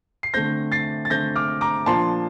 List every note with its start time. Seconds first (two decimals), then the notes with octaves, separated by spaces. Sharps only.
0.23 C7
0.34 D3 A3 C4 G6 A#6
0.72 A6 C7
1.05 A6
1.10 D3 A3 C4 G6 A#6
1.36 D6 F6
1.61 A#5 D6
1.86 A#2 F3 A#3 D4 A5 C6